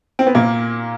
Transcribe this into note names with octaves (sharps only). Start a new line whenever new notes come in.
C4
B3
A#2 A#3